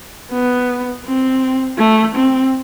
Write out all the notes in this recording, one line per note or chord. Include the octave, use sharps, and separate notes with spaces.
B3
C4
A3
C4